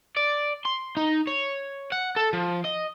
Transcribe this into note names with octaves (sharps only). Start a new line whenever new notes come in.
D5
C6
D#4
C#5
F#5
A4
F3
D#5